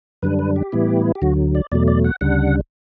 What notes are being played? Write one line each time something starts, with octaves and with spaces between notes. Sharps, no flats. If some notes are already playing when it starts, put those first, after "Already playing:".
F#2 D3 G3 D4 B4
B4
G4
A2 E3 G3 B3 E4
G4
D2 D3 F#3 F#4
D5
E2 B2 F#3 A3 D5
D5
F#5
D2 C#3 G3 D4 F#5